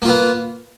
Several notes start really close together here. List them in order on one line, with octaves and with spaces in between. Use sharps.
A#3 F4 B3